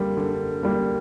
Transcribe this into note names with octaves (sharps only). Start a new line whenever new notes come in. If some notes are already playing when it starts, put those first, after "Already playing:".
Already playing: D3 G3 A#3
D3
G3 A#3